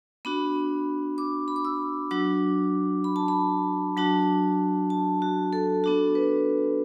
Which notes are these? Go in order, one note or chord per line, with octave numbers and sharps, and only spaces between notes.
B3 D4 F#4 B5
D6
B5
D6
E6
F#3 D4 F#4 D6
B5
A5
B5
F#3 D4 F#4 A5
A5
F#4
A4
B3 D4 F#4 A4
B4